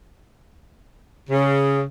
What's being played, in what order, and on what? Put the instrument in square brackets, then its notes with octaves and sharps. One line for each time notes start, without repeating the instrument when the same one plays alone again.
[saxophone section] C#3